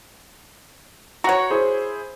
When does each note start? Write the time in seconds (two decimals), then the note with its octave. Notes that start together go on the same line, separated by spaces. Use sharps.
1.24 F#4 C#5 F#5 A#5
1.50 E4 G#4 C5